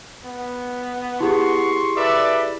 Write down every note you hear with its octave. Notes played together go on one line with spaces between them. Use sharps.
B3
E4 G4 G#4 C6 C#6
A4 B4 D5 E5